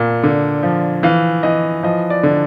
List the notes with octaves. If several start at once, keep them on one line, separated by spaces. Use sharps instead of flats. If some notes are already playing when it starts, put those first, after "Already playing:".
Already playing: A#2
D3
F3
E3 F5
E3 D#5
F3 D#5
D5
D3